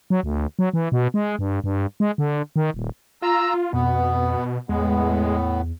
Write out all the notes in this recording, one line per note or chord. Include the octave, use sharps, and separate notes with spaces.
F#3
D2
F#3
E3
B2
G#3
G2
G2
G#3
D3
D#3
D#1
F4 A#5 E6
F2 B2 B3
E2 A2 G#3 B3